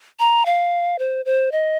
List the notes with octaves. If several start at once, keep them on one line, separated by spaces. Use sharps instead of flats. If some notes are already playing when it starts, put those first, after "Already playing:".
A#5
F5
C5
C5
D#5